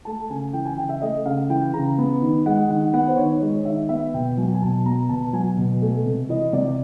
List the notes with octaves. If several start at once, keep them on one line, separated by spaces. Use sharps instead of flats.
A3 A5
C#3 G#5
E3 G5
G#5
C#3 G5
E5
A3 D#5
C#3 F5
E3 G5
C#3 A#5
B3
D#3
G#3 F#5
D#3 F#5
B3 F#5
C5
D#3 C#5
G#3 C#5
D#3 E5
B3 E5
B2 G5
F#3 G#5
G#5
B2 A5
B3 A#5
B2 A5
F#3 G#5
B2
A3
C3
E3 D#5
C3 D5